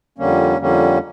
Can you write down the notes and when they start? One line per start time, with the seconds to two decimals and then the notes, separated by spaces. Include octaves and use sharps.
0.18 F2 D3 G3 A#3 C#4
0.58 F2 D3 G3 A#3 C#4